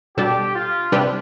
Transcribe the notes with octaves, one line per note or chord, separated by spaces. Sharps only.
B2 G3 D4 G4 A4
F4
C3 G3 D4 G4 B4